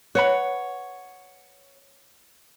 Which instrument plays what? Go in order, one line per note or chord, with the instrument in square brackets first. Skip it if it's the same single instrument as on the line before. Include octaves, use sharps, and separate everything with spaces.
[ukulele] B4 F#5 B5 [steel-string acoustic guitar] C#5